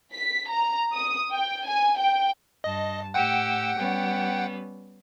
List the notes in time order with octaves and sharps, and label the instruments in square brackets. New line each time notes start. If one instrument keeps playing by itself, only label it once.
[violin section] B6
A#5
D#6
G5
G#5
G5
[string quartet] G2 A5 [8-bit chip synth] D#5
[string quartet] A2 G4 E6 [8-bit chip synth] F#5 G5
[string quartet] G3 B3 C#4